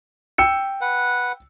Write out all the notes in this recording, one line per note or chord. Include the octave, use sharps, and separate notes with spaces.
G5 E6 C#7
B4 F#5